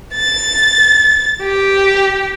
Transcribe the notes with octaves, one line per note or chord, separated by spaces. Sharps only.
A6
G4